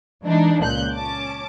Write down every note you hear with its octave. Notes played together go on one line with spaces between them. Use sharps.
E3 G#3 D4 D#4
C#2 A#2 F#6 G6
C#4 A5 D6